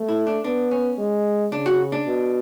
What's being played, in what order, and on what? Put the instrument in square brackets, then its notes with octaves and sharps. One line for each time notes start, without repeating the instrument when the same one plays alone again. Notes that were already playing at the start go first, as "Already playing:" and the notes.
Already playing: [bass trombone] A3
[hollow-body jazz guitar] E4
D4
[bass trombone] B3 [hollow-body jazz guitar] D4
[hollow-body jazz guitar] C#4
[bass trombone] G#3
[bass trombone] C#3 [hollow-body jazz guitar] D4
[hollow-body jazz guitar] F#4
D4
[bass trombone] B2